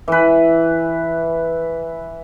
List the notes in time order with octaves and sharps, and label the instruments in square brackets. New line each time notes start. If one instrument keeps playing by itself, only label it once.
[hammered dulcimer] E3 B4